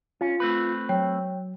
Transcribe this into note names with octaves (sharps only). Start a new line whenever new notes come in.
C#4 F4
A3 C4 B4
F#3 C#5 G5